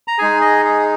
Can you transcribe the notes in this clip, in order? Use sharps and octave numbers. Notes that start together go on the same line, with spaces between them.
A#5
G#3 D#4 G#4 G#5
D#5
G#4